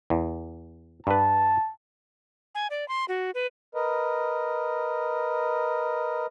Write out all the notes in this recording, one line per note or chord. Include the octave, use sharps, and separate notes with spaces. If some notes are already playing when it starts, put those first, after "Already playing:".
E2
G2 B4 A5
G#5
D5
C6
F#4
B4
A#4 B4 D#5